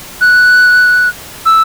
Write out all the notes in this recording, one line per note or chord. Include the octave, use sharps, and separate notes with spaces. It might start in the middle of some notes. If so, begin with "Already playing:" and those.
F#6
E6